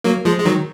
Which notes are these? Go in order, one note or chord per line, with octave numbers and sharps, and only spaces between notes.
F#3 A#3
F3 G#3
G#3
D#3 F#3